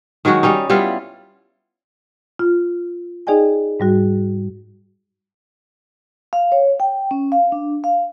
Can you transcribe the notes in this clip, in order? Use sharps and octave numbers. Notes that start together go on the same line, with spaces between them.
D#3 F#3 G#3 F#4
G3 C#4 D#4
G3 B3 E4 F4
F4
D#4 G#4 D5 D#5 G5 G#5
G#2 G3 F#4
F5
C#5
G5
C#4
F5
D4
F5